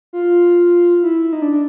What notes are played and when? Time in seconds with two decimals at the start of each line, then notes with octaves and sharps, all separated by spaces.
0.13 F4
1.03 E4
1.33 D#4
1.42 D4
1.52 D4